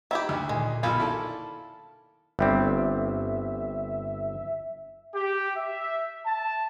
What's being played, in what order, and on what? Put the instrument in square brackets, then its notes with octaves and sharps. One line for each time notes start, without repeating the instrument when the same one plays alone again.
[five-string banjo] D#3 E4 G4 [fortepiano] E5
[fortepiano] D2
[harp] A#2 D#3 [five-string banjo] G#3
[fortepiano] B1 G#5 [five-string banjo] F4 A#4 [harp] B5 E6 A6
[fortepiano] E4 A4 [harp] D5 A5 C#6
[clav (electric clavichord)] G1 G3 C4 [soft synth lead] E5
[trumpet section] G4
E5
A5